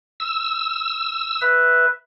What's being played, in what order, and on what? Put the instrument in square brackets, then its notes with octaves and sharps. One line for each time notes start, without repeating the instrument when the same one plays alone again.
[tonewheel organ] E6
[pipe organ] B4 E5